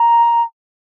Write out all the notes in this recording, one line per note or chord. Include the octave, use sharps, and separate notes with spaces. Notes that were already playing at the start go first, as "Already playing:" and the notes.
Already playing: A#5